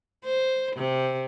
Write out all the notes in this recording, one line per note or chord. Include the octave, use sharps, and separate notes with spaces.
C5
C3